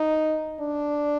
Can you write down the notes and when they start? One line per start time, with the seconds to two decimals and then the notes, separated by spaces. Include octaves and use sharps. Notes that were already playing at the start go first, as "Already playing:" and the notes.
Already playing: D#4
0.60 D4